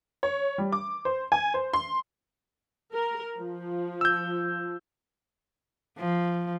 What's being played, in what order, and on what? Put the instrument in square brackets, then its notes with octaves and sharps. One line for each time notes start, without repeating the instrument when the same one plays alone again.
[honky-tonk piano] C#5
G3
D6
C5
G#5
C5
C6
[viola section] A#4
F3
[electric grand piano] E6 G6
[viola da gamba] F3